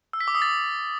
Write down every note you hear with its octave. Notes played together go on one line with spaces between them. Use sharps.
E6
B6
D6
D#6
A6